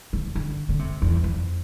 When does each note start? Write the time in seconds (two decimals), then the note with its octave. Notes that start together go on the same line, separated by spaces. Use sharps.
0.13 D3
0.35 D3
0.69 D3
0.79 C3
1.02 E2
1.24 F2